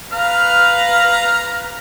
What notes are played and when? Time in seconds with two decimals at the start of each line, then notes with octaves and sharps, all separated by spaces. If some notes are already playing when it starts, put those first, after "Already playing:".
0.13 B4 F5 A#5 F6